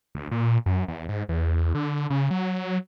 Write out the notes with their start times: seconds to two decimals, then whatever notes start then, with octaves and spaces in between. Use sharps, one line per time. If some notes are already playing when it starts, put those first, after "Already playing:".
0.15 D2
0.31 A#2
0.66 F#2
0.88 E2
1.09 G#2
1.29 E2
1.75 D3
2.10 C#3
2.31 F#3